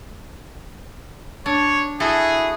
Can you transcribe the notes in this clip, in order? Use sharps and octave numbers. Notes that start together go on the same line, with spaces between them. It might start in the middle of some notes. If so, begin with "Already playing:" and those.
D4 C#5
E4 F#4 G#4 A4